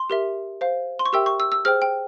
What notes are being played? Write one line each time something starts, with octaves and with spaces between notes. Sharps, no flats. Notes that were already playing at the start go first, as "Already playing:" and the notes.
Already playing: C6
G4 A#4 E5
C5 F5
C6
C#6
G4 A#4 E5 G5 E6
C#6
E6
E6
G#4 C5 G5 F6
G5